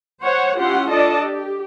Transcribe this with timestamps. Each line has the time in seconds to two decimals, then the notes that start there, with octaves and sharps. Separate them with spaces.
0.24 C5 C#5 F#5
0.59 C#4 E4 F4 G4 F#5 C6
0.89 D4 F4 A4 D5 D#5 A5
1.23 G4